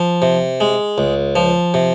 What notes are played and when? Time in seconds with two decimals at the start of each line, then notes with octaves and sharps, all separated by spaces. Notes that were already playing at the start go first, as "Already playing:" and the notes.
Already playing: F3
0.22 C3
0.61 G#3
0.98 C#2
1.36 F3
1.74 C3